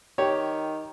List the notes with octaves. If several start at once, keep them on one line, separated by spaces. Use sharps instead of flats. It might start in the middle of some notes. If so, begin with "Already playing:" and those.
D#3 G4 C#5